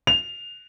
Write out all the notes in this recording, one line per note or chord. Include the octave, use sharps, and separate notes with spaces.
F7